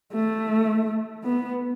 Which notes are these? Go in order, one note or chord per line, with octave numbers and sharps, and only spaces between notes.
A3
B3